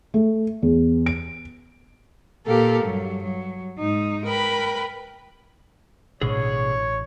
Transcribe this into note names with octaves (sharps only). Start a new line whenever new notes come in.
A3
E2
D7
A#2 G4 A4 A#4 F5
G2 F#3
F#3
G#2 D#4
A#4 B4 G5 B5
A1 B2 D3 G#4 C#5